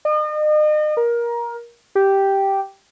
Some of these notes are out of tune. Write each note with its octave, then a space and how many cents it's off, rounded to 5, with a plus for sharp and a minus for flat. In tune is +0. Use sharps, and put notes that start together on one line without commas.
D#5 -40
A#4 +20
G4 -5